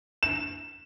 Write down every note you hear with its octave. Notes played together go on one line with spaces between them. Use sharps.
E7